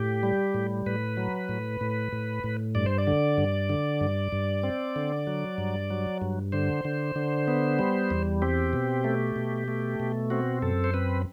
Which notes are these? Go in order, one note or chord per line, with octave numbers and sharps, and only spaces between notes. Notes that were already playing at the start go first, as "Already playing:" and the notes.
Already playing: A2 G4
G3
A2
A2 B4
F#3
A2
A2
A2
A2
G2 D5
C5
D5
D3
G2
D3
G2
G2
C4
D3
F#3
G2
F#3
G2
D3 C5
D3
D3
B3
G3
E2
C4 G4
B2
A3
B2
A3
B2
C4 F#4
F#2 A4
C5
C4 B4